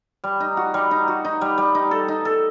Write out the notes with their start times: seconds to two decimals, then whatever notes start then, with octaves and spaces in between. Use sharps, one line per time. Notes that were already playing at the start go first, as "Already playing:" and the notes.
0.24 G3
0.40 D#4
0.57 F#4
0.74 G3
0.91 D#4
1.08 F#4
1.25 D#4
1.41 G3
1.58 G3
1.75 D#4
1.91 A4
2.08 D#4
2.25 A4